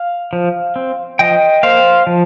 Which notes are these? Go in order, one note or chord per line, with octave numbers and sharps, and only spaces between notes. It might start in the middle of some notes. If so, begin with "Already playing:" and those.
Already playing: F5
F3
C4
F3 D#5 G5
A#3 C5 F5
F3